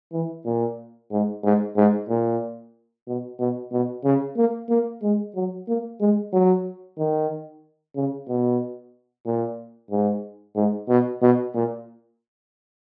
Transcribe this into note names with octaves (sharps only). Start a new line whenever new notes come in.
E3
A#2
G#2
G#2
G#2
A#2
B2
B2
B2
C#3
A#3
A#3
G#3
F#3
A#3
G#3
F#3
D#3
C#3
B2
A#2
G#2
G#2
B2
B2
A#2